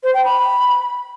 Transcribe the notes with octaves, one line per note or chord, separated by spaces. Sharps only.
C5
G5
B5